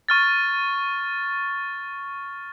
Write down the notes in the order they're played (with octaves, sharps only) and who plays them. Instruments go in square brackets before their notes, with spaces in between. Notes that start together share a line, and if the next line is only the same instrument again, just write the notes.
[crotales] C#6 F6 A6